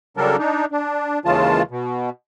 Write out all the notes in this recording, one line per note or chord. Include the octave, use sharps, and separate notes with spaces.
C#3 F#3 G3 D4 A4 A#4
D4 D#4
D4
D#2 C#3 E3 G#3 F4 A5
B2